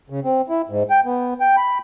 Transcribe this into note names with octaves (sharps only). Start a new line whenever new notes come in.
C#3
C4
E4
G#2
G5
B3
G5
B5